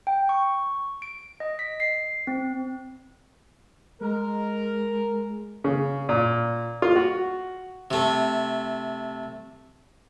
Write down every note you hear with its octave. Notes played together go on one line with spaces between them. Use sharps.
G5
C#6
D7
D#5
B6
C7
C4
G#3 A#4
C#3
A#2
F4
F#4
C3 A3